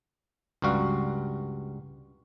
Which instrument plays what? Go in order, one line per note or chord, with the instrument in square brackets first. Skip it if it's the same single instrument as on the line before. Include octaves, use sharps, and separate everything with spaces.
[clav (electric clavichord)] C#2 G2 G3 F#4 F5